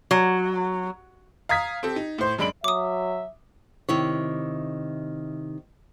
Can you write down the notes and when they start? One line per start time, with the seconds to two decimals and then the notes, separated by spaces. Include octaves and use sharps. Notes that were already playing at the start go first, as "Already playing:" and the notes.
0.11 F#3
1.49 F5 A#5 D#6 G#6 B6
1.83 C4 G4 A4
1.96 D#4
2.18 A2 C5
2.38 F#2 G#3 D4 B5 D7 F#7
2.64 F#3 E5 D6 D#6
3.89 C3 D#3 E4 C#5